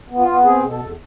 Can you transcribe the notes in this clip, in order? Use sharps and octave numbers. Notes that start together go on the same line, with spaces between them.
B3
F4
B3
C4 G#4
B2
A4
E2